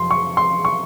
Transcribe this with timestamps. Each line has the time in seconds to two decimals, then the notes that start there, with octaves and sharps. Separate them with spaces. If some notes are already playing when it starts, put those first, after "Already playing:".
Already playing: F1 F2 F#3 C6
0.11 C#6
0.37 C6
0.65 C#6